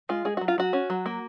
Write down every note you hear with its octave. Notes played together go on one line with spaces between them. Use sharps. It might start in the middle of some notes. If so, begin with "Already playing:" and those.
G#3 F4
G#3 G#4
F#3 F#4
F4
F#3 F#4
C#4
F#3
A#3